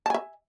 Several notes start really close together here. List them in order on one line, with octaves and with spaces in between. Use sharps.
A5 G#5 E5